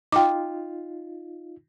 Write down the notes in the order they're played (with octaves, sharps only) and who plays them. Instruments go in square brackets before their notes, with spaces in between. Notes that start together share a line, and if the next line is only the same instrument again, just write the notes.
[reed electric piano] D#4 F4 [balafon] G5 D6